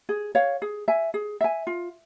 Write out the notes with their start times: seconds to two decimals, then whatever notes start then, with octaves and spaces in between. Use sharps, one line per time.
0.09 G#4
0.35 C#5 F5
0.62 G#4
0.88 E5 G#5
1.14 G#4
1.41 E5 G#5
1.67 F4